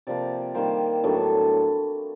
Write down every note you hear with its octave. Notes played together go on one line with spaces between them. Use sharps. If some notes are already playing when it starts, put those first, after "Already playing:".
C3 F3 A#3 D5
D#3 G3 A#3 C5
A2 F#3 B3 D4